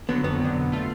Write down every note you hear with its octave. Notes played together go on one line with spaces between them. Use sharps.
D3 F#3 B3
F2 B3
D3 F#3
B2
A3 F4